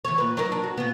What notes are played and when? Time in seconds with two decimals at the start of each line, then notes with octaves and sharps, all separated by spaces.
0.05 E3 C#5
0.18 A#2 B4
0.37 F#3 D#4 A#4
0.52 D4
0.64 F#4
0.77 A#2 B3